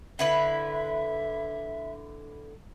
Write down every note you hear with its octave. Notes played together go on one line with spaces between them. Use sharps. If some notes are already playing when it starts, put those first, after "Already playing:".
D3 E4 B4 E5